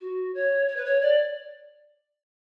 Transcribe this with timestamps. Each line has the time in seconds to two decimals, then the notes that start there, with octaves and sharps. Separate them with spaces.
0.01 F#4
0.34 C#5
0.68 C#5
0.76 B4
0.85 C#5
1.01 D5